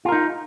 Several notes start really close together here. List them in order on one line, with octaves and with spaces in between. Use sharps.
F4 A#4 D#4